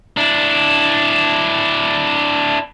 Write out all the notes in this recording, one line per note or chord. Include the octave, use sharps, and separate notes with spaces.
D4 E4